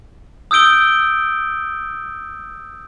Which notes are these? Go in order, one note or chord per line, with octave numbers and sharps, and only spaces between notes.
D#6 E6 G6 D7 G7